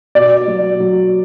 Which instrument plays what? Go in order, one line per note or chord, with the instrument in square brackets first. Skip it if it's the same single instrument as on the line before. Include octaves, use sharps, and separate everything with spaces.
[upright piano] B2 D5
F#3
F#3